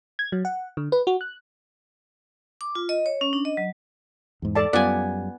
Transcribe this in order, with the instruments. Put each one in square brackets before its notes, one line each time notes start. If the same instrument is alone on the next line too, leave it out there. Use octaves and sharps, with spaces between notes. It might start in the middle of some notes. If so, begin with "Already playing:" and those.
[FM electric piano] G#6
F#3
F#5
D3
B4
F#4
F#6
[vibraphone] D6
F4
D#5
C#5
C#4
D4
D#5
F#3
[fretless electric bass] E2 G#2
[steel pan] A4 D5 A5
[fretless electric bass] F#2 G3 [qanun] B3 G#5 [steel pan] F4 D5